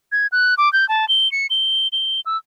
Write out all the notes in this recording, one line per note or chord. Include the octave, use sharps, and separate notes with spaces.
G#6
F#6
D6
G6
A5
G7
C#7
G7
G7
E6